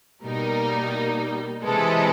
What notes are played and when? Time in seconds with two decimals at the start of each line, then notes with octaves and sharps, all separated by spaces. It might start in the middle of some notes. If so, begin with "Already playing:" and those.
0.22 B2 G3 A#3 D#4 A#4
1.63 C3 E3 G#3 A4 B4